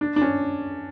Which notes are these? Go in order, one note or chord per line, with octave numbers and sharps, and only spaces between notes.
D4
D4
C#4